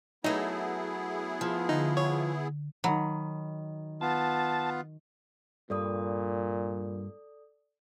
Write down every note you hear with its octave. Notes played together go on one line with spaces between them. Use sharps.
F#3 A3 B3 D#4 E4 G#4
F3
D3 D#4
C#5
D#3 F#3 B5
B3 F4 A5
G2 A#2 A4 D5 D#6